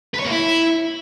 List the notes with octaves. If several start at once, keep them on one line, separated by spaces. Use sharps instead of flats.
B4
C#5
A#3
E4